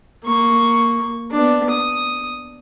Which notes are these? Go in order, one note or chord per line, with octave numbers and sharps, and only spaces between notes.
A#3 C#6
B3 D4
D#6